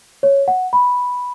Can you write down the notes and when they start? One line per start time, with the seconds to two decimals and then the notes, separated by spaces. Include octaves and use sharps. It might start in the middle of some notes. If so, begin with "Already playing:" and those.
0.23 C#5
0.48 F#5
0.73 B5